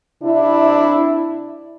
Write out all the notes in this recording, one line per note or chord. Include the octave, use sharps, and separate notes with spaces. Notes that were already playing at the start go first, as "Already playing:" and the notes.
C3 D4 E4